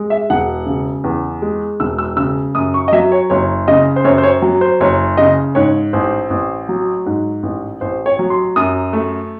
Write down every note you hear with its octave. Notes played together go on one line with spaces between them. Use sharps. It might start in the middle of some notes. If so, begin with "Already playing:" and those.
Already playing: G#3
E5
E1 F#5
C#3
E2
G#3
E1 E6
E6
C#3 E6
F#2 D#6
C#6
D#5
F#3 E5
C#5
F#1 C#5
C#3 D#5
C5
F#2 C#5
C5
C#5
F#3
C5
F#1 C#5
C#3 D#5
G#2 C#5
A1 C5
A1
F#3
G#2
A1
A1 C5
C#5
F#3
C6
F#2 D#6
A3